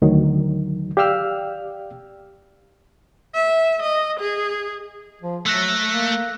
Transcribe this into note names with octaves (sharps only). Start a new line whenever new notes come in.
D2 D#3 F#3
G4 D5 F5 G5 E6 F6
E5
D#5
G#4
F3
F#3 A3 E6 F#6 A#6
A#3